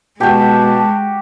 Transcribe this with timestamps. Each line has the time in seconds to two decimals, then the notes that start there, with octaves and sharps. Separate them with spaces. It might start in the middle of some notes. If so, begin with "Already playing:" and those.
0.20 B2 G#3 F#4 G4 A5